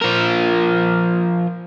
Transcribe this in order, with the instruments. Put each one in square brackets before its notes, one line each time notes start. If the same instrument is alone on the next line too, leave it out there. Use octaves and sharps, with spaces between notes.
[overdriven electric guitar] F3 A#4